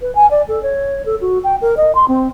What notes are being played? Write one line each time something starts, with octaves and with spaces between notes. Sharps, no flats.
B4
G#5
D5
A4
C#5
A4
F#4
G5
A#4
D#5
C6
C4